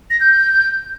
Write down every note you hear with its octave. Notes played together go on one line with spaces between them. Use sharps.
A#6
G6